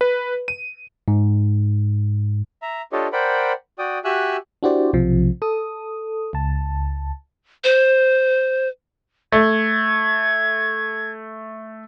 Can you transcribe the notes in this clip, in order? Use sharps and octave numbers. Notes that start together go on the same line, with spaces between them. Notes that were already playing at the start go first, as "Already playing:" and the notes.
B4
D#7
G#2
E5 A#5
D4 F4 G4 A4 C#5 D#5
A#4 C5 D5 F#5 G5 B5
F#4 D5 G5 D#6
F#4 G4 E5 G#5 E6 F#6
D4 E4 F#4 G4 C5 D5
B1 C3 F3
A4 D#6
C#2 A5
C5
A3 G#6